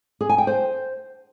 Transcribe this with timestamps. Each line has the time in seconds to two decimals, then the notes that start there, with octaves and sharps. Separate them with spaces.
0.21 G#4
0.29 G#5
0.38 G5
0.47 C5